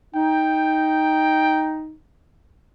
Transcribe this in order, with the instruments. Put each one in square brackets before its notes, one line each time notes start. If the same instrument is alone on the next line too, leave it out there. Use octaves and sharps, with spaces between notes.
[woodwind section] D#4 [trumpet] G5